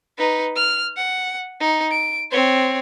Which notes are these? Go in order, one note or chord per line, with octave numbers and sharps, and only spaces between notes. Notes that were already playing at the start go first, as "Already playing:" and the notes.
D#4 B4
F6
F#5
D#4
D7
C4 C#5